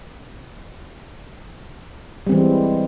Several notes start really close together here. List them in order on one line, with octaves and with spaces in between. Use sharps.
G3 C4 E3 G#3